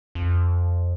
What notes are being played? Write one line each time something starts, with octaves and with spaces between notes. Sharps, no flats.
F2